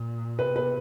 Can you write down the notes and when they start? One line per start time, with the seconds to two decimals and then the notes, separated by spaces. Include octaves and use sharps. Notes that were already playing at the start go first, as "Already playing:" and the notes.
Already playing: A#2
0.39 C3 B4
0.56 B4